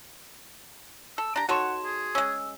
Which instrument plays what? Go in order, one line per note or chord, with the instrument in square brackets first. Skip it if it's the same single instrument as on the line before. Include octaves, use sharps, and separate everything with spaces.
[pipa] A4 [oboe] E6
[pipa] D4 G4 [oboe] A#5
[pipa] D#4 A4 C#5 [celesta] F#4 C6 E7 [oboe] F#5
[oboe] G#4
[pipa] G#3 C#4 [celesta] E6